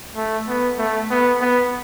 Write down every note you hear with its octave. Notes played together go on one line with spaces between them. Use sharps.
A3
B3
A3
B3
B3